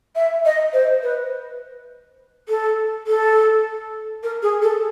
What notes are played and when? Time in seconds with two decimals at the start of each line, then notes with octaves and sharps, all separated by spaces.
0.15 E5
0.45 D#5
0.73 C5
1.02 B4
2.48 A4
3.07 A4
4.23 A#4
4.42 G#4
4.62 A4